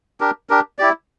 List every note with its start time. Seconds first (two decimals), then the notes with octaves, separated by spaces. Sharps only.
0.20 D4 G4 A#4
0.49 D4 G4 A#4
0.79 E4 G4 D5